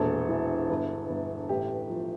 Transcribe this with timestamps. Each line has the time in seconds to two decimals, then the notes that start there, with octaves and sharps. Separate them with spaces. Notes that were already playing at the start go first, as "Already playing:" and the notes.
Already playing: E1 A#1 A4
0.29 E3
0.70 G1
1.10 G1
1.49 A1 G4
1.89 F3